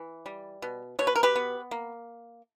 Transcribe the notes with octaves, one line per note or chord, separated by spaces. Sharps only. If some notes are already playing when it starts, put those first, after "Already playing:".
Already playing: E3
G3
B2
B2 C#5
B4
A#4
G4 B4
B3
A#3